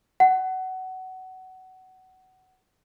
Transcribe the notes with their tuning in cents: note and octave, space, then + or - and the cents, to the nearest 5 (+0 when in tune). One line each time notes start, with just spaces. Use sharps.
F#5 +20